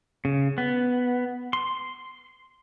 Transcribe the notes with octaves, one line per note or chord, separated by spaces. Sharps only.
C#3
B3
C6